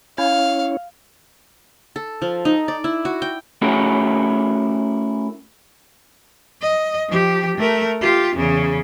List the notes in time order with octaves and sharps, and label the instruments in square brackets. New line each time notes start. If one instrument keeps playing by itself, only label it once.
[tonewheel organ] C#4 E4 C#5 [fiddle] F5
[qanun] A4
F3
D#4
D5
E4
F#4
G5
[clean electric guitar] A3 C#4 E4 F#4 G#4 A#4
[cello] D#5
F3 G4
A3 A#4
F4 G4
E2 C#3